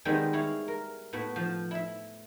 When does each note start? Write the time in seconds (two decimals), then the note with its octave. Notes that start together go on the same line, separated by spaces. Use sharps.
0.05 D#3 G3 G#3 B3 C4
0.33 E4 C#5 F5
0.68 A#4
1.13 A2 B3 F#4
1.36 F3
1.71 E4 E5